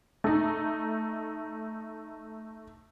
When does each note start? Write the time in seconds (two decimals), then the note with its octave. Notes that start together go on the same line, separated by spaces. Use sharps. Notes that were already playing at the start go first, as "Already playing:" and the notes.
0.24 A3 D#4